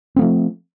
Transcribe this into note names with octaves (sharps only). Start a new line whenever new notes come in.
F3 A3 C4